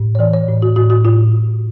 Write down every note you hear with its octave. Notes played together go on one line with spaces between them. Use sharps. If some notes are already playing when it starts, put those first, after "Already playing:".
Already playing: A2
C#5
E3 D5
C#5
A2
F#4
A2 F#4
F#4
A2 F4